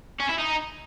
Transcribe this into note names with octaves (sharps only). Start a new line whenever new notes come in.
C#4
E4
D#4